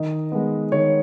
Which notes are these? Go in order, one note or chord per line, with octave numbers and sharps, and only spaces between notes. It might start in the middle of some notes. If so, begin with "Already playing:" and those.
Already playing: D#3 D#5
G#3 B3
D#3 C#5